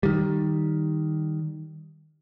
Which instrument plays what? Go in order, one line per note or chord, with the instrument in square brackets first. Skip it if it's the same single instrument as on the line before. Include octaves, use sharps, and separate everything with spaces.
[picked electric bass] D#3 G3